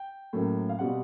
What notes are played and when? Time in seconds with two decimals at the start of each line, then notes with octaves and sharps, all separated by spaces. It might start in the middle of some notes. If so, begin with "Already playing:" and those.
Already playing: G5
0.33 A2 F#3 A#3 C#4
0.69 F5
0.79 B2 G3 C4 F#5